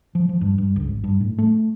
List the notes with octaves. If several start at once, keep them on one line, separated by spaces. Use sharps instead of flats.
F3
F3
G2
G2
C#2
G#1
G2
A2
A3